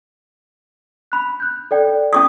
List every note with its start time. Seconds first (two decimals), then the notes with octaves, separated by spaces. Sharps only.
1.12 B5 F#6
1.40 F#6 G6
1.71 A4 D5 G5
2.13 C#4 D6 D#6